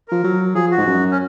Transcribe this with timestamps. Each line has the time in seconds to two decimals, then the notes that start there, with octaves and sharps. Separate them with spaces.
0.08 F3 A#4
0.24 F#3
0.55 F3 G#4
0.71 F#4
0.78 G#2
0.87 F#2
1.11 C#4